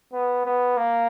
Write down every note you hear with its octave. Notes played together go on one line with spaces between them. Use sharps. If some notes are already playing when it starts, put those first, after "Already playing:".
B3
B3
A#3